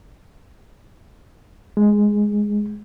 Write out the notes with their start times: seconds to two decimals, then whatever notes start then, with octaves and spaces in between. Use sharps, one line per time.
1.77 G#3